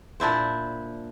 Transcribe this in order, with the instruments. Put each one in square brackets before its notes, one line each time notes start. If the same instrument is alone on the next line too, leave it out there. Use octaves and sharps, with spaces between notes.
[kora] A#2 D4 E4 C5